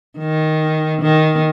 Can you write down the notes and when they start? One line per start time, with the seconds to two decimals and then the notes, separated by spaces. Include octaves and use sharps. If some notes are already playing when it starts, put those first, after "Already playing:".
0.18 D#3
1.02 D#3